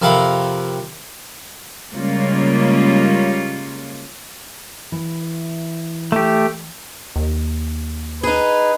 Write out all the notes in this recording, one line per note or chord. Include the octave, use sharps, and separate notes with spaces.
F2 C3 A#4 F5 F#5 B5
C#3 G3 G#3 A#3 C#4 F4
E3
A3 G4
D#2
D#4 G#4 B4